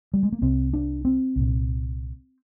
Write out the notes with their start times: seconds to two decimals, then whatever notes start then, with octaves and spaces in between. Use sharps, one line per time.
0.14 G3
0.23 G#3
0.32 A#3
0.41 C2 C3 C4
0.73 D4
1.05 C4
1.36 C2 A#2